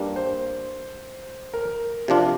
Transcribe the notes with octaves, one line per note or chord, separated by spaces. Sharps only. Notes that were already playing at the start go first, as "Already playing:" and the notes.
Already playing: G2 G3 A#3 D4
C5
A#4
C3 F3 D4 F4